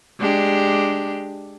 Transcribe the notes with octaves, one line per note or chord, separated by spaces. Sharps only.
G#3 D4 G4